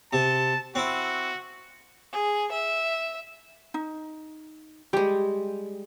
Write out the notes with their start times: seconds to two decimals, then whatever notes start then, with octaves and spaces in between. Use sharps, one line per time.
0.13 C3 A5
0.75 C4 E4 F#4
2.11 G#4
2.51 E5
3.74 D#4
4.93 G3 G#3 G4